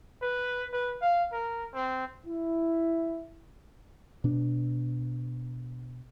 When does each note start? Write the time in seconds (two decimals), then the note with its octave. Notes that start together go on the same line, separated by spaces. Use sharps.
0.22 B4
0.73 B4
1.01 F5
1.32 A#4
1.74 C4
2.26 E4
4.24 B2 D4